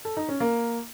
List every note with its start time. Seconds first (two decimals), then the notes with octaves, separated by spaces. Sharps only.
0.05 A4
0.17 D#4
0.29 C#4
0.40 A#3